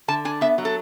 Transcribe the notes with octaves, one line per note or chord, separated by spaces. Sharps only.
D3 A5
D4 G#5
B3 E5
F#3
A4